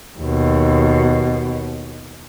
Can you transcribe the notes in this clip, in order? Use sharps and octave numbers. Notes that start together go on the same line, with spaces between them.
D#2 B2